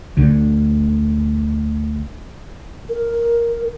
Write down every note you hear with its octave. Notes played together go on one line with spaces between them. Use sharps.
D2 D3
A#4